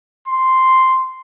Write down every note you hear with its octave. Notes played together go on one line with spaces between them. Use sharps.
C6